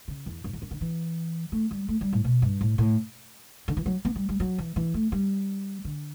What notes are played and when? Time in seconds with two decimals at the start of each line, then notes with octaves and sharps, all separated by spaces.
0.08 C#3
0.26 E2
0.44 F#2
0.53 E2
0.62 F#2
0.71 D3
0.81 E3
1.52 A3
1.71 G3
1.89 A3
2.01 G3
2.13 A2
2.24 B2
2.42 G2
2.61 A2
2.78 A2
3.68 D3
3.77 E3
3.86 F#3
4.05 B3
4.16 G3
4.29 G3
4.40 F#3
4.58 E3
4.76 E3
4.94 A3
5.12 G3
5.85 D3